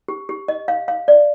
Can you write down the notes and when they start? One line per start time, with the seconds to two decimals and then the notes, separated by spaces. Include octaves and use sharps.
0.08 G4
0.29 G4
0.48 D#5
0.68 F5
0.88 F5
1.08 D5